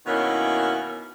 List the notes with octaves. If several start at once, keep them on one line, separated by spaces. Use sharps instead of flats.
B2 D#3 A#3 C#4 E4